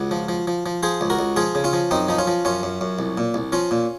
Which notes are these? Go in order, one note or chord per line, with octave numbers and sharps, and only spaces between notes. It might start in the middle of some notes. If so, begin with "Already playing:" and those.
Already playing: C#2 F#4
F3
F3
F3
F3
F3 G#4 C5
C#2
F#4 A#4
C#2
F3 F4 G#4
C#3
C#4 F4
F3
F#2 C4 D#4
F3 D#4
C#4 F4
F3
F#2 C#4 F4
F#2
F#2
C2
A#2
C2
F3 C#4 F4
A#2